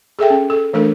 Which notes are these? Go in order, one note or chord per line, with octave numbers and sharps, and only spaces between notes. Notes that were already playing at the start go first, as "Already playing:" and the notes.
G#4 A4 E5 G5
C#4
A4
E3 A3 D4 A4 A#4